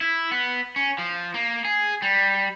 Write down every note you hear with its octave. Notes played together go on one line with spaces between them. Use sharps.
E4
B3
C#4
F3
A#3
G#4
G3